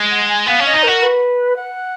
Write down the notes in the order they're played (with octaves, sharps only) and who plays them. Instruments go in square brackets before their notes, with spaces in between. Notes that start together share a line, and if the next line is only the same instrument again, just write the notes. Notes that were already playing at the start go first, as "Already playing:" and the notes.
Already playing: [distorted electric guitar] G#3
[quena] F#5
G#5
[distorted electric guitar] B3 [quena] F5
[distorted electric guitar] C#4
[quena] D#5
[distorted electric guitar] D#4
[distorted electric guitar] F#4 [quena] A#4
[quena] B4
F#5